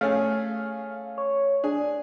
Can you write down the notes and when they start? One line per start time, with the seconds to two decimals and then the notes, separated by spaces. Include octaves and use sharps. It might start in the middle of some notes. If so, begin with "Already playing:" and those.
0.01 A3 C#4 G#4 F5
1.18 C#5
1.64 D4 G#4